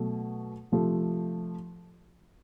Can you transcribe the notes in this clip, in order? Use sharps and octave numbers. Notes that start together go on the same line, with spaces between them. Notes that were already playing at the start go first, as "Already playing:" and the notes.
Already playing: B2 F#3 A3
C3 F3 A3